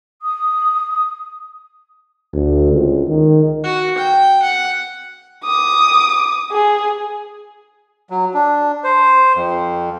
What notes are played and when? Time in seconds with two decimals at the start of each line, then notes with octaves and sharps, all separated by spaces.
0.22 D#6
2.34 D2
2.73 C#2
3.08 D#3
3.64 F#4
3.98 G5
4.42 F#5
5.44 D6 D#6
6.52 G#4
8.10 F#3
8.34 D4
8.84 C5
9.36 F2